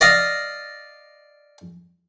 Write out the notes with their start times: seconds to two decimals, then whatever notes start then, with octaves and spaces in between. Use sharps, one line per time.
0.01 D5 D#5 F5